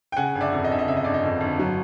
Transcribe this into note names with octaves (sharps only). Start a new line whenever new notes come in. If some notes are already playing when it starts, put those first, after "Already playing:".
G5
C#3 F#5 G#5
G1
D5 E5
F2
D#5
G1 E5
D#5
C#3 E5
D#5
G1 D5
D#5
F2
G1
F#3